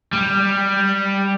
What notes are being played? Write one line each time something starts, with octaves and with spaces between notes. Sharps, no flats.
G3